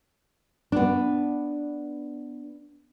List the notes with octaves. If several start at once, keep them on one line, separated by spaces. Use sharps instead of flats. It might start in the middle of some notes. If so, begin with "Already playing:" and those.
B3 D4